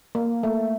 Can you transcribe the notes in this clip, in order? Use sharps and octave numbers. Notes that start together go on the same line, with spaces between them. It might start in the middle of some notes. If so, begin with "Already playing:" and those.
A#3
A3